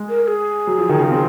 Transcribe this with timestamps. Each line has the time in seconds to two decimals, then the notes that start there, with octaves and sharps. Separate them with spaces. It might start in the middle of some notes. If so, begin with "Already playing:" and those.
Already playing: G#3
0.09 A#4
0.23 A#4
0.27 G#4
0.67 F#3
0.78 F3
0.89 D#3
1.00 C#3
1.11 C4